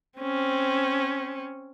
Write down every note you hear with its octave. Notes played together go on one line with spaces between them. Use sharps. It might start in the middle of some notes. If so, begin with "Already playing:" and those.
C4 C#4